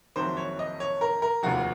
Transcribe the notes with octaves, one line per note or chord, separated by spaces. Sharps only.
F#1 F2 D#3 F#3 C4 C5
C#5
D#5
C#5
A#4
A#4
F1 D#2 C#3 F3 F#4